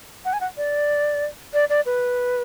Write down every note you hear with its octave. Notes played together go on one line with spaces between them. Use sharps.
F#5
G#5
F#5
D5
D5
D5
B4